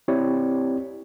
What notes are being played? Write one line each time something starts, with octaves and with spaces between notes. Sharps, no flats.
C4 E4 G4 C#5 D5